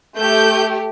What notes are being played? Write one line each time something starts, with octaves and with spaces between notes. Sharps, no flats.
A3 G4 G6